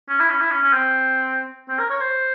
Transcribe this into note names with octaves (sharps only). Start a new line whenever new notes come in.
C#4
E4
C#4
E4
C#4
C#4
C4
C4
A#4
C#5
C5